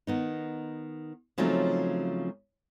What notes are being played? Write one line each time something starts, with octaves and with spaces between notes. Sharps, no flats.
D#3 B3 D#4
C#3 F3 F#3 A3 C4 D#4